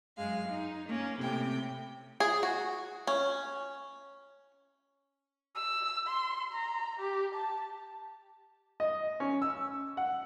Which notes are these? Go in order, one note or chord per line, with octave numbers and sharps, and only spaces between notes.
F#2 G#3 F5
D#4
A#3 C#4
A2 C3 G5
G#4
F#4
C#4
E6
C6
A#5
G4
A5
D#5
C#4
E6
F#5